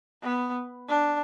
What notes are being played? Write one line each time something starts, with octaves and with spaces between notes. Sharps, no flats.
B3
D4